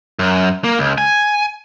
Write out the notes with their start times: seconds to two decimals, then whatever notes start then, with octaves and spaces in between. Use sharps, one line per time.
0.19 F#2
0.64 A#3
0.79 C#2
0.98 G#5